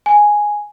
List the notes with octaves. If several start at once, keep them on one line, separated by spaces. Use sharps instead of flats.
G#5